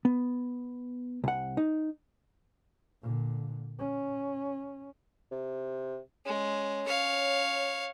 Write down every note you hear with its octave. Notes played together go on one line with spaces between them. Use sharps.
B3
C2 F#5
D#4
A#2 D3
C#4
C3
G#3 C#4
C#5 F5